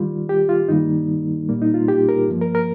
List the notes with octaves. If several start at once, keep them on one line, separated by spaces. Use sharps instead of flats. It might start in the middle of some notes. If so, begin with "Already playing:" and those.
Already playing: D#2 D#3 G3 F4
G4
F4
G2 D#3 G3 A#3 D#4
C2 A#2 G3 A#3
D#4
F4
G4
A#4
G2 F3 A#3
A#4
A#4